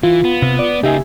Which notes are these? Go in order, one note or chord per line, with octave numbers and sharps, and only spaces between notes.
E3 F4
B3
C3
D5
C#3 A#3 D#4 G4 E5 G#5